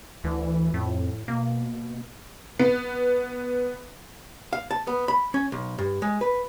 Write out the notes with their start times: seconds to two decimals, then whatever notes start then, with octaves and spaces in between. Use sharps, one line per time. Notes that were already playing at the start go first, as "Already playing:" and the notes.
0.24 D2 E3
0.74 F2 A2
1.28 B2 A#3
2.59 B3
4.53 F5
4.71 A5
4.87 B3
5.08 B5
5.34 C#4
5.52 B1
5.78 G2
6.02 G#3
6.21 B4